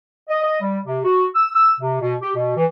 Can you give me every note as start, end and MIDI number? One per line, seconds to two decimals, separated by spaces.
0.28 0.39 75
0.42 0.60 75
0.61 0.78 55
0.86 0.99 48
1.04 1.25 66
1.34 1.49 88
1.54 1.71 88
1.81 1.97 48
2.00 2.14 47
2.21 2.31 67
2.35 2.52 47
2.55 2.64 52